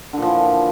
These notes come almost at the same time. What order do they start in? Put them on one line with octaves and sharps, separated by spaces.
D3 A#2 F3 E3